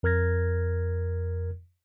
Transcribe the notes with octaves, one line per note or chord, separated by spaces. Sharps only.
F2 A#4 F6 G#6 A#6